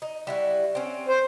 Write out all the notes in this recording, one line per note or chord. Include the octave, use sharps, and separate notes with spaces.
D#4
G3 E4 F#4
C4 C#4
C5